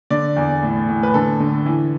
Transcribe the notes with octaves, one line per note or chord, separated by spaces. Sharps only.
D3 D5
E2
A2
A2
B4
D3 A4
D3
E3